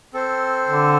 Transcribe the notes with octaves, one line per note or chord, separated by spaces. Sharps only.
C4 A4 C5
D3